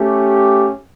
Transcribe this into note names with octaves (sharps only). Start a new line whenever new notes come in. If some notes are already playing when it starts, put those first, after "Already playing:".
Already playing: A3 C#4 G4